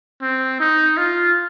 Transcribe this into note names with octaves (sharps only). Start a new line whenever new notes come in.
C4
D#4
F4